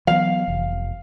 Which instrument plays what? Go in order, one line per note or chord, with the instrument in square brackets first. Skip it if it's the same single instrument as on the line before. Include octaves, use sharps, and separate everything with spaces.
[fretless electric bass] E3 F#3 B3 [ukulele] F5
[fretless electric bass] F1